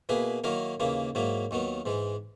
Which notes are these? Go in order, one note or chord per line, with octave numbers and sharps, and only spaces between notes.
B2 A#3 E4 G#4 B4
D#3 F#3 A#3 E4 A#4
D#2 C#3 E3 A#3 E4
G#2 F#3 A#3 E4
D#2 D#3 F#3 B3
G#2 E3 G#3